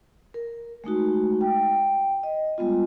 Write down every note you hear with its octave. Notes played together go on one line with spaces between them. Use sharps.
A#4
G#3 A3 D#4 F#4
G5
D#5
G3 G#3 B3 F4